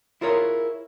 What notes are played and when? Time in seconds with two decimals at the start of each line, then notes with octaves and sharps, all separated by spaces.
0.21 E4 F4 G#4 A#4 C#5